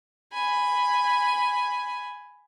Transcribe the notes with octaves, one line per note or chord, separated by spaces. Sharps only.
G#5 B5